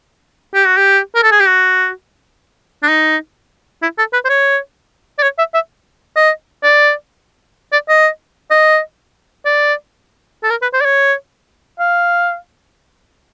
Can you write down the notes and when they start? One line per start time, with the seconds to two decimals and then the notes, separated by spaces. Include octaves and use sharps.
0.54 G4
0.66 F#4
0.77 G4
1.15 A#4
1.23 A4
1.32 G#4
1.40 G4
1.48 F#4
2.83 D4
2.88 D#4
3.82 E4
3.98 A4
4.13 B4
4.25 C5
4.29 C#5
5.18 D5
5.23 C#5
5.38 E5
5.54 E5
6.16 D#5
6.63 D5
7.72 D5
7.89 D#5
8.51 D#5
9.45 D5
10.43 A4
10.50 A#4
10.62 B4
10.73 C5
10.81 D5
10.85 C#5
11.79 F5